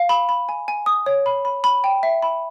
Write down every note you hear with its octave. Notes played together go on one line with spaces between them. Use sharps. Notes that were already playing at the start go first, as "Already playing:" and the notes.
Already playing: F5
B5
B5
G#5
G#5
D#6
C#5
B5
B5
B5
G5
E5
B5